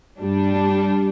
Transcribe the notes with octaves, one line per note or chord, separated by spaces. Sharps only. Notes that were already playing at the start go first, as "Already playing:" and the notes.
G2 G3 D4